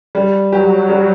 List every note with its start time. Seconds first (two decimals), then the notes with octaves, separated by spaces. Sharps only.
0.15 G3
0.52 F#3 G4
0.89 G3